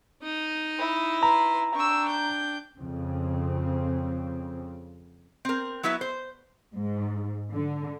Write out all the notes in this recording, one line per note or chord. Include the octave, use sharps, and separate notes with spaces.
D#4 D#5
E4
B4 A#5 C6
D4 G5 C#6 E6
G6
F2 C#3 C4
C4 A#4
F#3 B3 E4 B4 E5
C5
G#2
D3